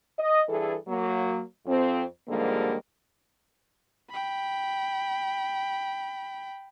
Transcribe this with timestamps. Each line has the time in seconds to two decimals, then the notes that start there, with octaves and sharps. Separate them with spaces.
0.19 D#5
0.49 G2 E3 G#4 A4
0.88 F#3 A#3
1.67 F2 C4
2.29 D#2 G#2 D3 F3 G3 A#3
4.10 G5 B5